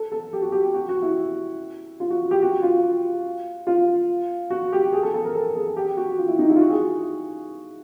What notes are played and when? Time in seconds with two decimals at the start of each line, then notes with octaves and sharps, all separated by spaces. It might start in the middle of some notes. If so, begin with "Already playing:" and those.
Already playing: A4
0.12 A4
0.33 G4
0.42 F#4
0.52 G4
0.74 F#4
0.89 F#4
1.03 E4
2.00 F4
2.10 F#4
2.31 G4
2.42 F#4
2.62 F4
3.67 F4
4.50 F#4
4.73 G4
4.92 G#4
5.03 A4
5.14 A4
5.25 A#4
5.34 A4
5.55 G#4
5.77 G4
5.97 F#4
6.18 F4
6.28 E4
6.39 D#4
6.50 E4
6.56 F4
6.61 F#4
6.70 G#4